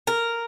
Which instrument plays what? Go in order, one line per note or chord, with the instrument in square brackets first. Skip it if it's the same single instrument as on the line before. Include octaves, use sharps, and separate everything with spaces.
[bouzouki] A#4